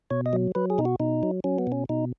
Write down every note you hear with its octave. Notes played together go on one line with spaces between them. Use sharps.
B2 C#5
D#5
F#3
F#3 B4
G#4
B2 D#4
F#4
B2 D#4
F#3
F#3 C#4
B3
B2 C#4
B2 D#4